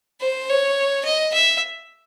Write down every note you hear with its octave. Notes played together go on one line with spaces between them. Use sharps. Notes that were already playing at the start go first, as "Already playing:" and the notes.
C5
C#5
D#5
E5